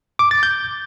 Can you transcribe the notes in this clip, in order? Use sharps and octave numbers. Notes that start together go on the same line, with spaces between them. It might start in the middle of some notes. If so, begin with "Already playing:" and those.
D6
A6
G6